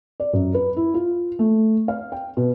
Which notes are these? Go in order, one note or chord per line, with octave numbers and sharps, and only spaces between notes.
D5
F#2
B4
E4
F4
A3
F5
G5
B2